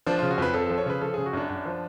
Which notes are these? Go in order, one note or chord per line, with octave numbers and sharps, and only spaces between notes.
F3 D4
C#3 F4
F#4
F2 B4
F2 A4
F3 A4
C#5
C#3 B4
F3 A4
C#3 G#4
F#4
F#2 D4
F#2
F3